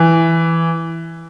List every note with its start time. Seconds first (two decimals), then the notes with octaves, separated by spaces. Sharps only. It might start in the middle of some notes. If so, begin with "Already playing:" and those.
Already playing: E3